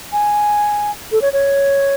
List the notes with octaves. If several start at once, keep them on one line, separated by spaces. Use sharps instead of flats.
G#5
A4
C#5
C#5